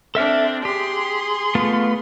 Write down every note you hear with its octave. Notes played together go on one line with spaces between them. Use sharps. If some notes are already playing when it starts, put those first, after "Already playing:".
C4 D4 A4 E5 F6
G4 G#4 C6
A3 B3 F4